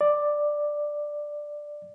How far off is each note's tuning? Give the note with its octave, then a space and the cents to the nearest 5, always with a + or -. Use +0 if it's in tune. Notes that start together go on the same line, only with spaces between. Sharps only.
D5 +10